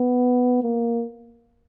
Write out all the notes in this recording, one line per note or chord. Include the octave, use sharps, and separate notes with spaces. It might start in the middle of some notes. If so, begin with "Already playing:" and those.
Already playing: B3
A#3